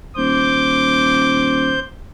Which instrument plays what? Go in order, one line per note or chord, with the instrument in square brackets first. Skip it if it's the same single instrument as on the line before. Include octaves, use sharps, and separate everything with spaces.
[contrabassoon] D#1 [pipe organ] C5 G6 [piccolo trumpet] D6